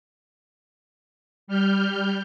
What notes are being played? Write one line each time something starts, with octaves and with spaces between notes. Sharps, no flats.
G3 F6 G6